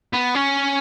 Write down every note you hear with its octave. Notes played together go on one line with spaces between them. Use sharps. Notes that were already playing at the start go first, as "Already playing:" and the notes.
B3
C#4